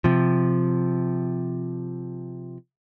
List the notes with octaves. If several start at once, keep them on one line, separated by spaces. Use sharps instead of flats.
C3 F3